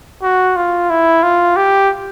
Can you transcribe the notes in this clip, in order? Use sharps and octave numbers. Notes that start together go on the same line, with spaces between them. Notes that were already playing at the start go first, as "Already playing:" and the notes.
F#4
F4
E4
F4
G4